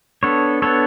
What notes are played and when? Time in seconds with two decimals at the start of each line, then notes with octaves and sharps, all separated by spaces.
0.23 B3 D4 A4 C#5
0.62 B3 D4 A4 C#5